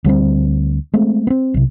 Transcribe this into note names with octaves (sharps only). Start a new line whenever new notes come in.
D2 G3 A#3 C4
G#3 A3 C4
B3 C4
B1 C3